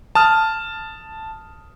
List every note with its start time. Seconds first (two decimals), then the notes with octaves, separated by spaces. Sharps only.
0.15 A5 D#6 F6